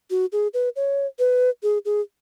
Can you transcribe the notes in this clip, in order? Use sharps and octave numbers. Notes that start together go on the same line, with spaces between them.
F#4
G#4
B4
C#5
B4
G#4
G#4